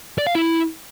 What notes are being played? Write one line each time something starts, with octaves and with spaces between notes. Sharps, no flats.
D5
F5
E4